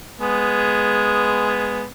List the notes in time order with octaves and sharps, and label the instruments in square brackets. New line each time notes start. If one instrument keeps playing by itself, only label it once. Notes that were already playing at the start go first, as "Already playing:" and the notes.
[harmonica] G#3 B3